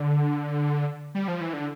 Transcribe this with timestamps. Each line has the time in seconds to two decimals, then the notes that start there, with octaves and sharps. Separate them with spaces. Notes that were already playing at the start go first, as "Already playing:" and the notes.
Already playing: D3
1.15 G3
1.28 F3
1.41 E3
1.53 D3